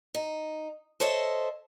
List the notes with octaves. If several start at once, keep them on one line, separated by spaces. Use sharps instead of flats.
D#4
A4 C5 C#5 D#5 E5